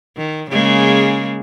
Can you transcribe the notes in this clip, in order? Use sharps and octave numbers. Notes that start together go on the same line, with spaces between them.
D#3
C#3 G#3 A#3